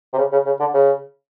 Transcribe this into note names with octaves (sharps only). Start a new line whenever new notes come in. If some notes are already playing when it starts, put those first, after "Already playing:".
C3
C#3
C#3
C#3
D3
C#3